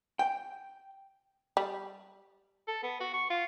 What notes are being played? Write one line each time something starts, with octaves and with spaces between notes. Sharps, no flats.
G5
G3
A4
B3
F#4
C#6
F4